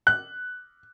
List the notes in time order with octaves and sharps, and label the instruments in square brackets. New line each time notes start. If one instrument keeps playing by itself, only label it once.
[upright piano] F#6